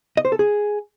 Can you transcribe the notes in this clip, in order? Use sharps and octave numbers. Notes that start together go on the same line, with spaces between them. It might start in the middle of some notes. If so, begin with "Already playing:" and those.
D#5
C5
A4
G#4